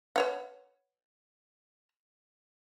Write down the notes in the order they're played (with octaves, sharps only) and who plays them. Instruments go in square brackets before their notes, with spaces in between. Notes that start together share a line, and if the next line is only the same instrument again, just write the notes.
[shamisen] B4 C#5 F#5